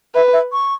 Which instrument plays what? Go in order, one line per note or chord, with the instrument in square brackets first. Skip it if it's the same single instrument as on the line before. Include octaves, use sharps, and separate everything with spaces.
[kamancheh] B4 [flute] E5
[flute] E5
C#6